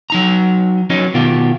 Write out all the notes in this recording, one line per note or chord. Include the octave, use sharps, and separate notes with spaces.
F#3 D#4 A#5
F#3 C#4 D#4
B2 D#3 F4 G4